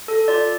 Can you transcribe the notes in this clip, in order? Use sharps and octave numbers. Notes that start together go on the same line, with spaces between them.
A4
F4 D5